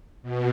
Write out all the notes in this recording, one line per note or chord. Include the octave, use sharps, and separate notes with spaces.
B2